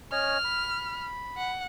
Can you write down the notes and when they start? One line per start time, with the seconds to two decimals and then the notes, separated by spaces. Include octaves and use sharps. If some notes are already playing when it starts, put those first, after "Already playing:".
0.12 C#4 C#5 D#5 F6
0.44 B5
1.37 F#5